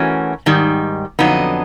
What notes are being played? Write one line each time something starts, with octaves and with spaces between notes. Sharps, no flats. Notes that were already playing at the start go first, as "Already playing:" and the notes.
Already playing: E3 A3 C#4 F#4 A#4
G#2 D#3 G3
F2 D3 F#3 B3 D#4